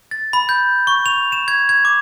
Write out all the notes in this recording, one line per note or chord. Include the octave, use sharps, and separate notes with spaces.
A6
B5
G6
C#6
F7
E7
G#6
G#6
D6